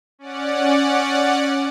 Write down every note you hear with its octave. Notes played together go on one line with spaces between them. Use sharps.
C#4 D5 F#5